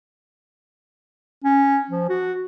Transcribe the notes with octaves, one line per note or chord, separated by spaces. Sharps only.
C#4
F3
F#4